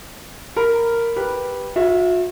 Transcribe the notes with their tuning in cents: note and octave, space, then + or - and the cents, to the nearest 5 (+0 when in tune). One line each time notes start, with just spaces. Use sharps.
A#4 -5 B5 +0
G4 +0 B4 -10
F#4 -45 E5 +0